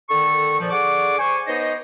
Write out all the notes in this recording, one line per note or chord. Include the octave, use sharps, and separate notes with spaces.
D3 D#3 A4 C#6
A#2 F3
D3 G#4 D5 F#5 C#6 D6
C5 G#5 C#6
B3 D#4 C5 C#5 D#5